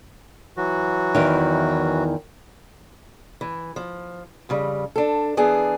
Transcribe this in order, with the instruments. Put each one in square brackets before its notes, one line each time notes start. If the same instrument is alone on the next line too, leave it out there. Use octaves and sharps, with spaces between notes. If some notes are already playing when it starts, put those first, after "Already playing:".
[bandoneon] E3 F#3 F#4
[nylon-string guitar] E2 D#3
[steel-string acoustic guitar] E3
F3
F2 C#3 G3
D4 A4
E3 B3 D4 G#4